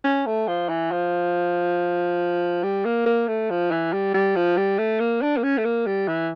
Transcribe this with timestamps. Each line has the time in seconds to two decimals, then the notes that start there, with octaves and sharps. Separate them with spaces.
0.05 C#4
0.26 A3
0.48 F3
0.69 E3
0.91 F3
2.63 G3
2.85 A#3
3.06 A#3
3.28 A3
3.50 F3
3.71 E3
3.93 G3
4.14 G3
4.36 F3
4.57 G3
4.78 A3
5.00 A#3
5.22 D4
5.37 A#3
5.43 C#4
5.58 A3
5.65 A#3
5.86 G3
6.08 E3